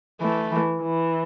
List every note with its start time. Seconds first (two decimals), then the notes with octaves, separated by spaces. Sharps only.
0.21 E3 A3
0.51 E3
0.82 E3